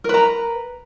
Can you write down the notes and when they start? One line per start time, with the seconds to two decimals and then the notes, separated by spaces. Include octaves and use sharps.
0.04 A#4
0.09 B4
0.14 A#5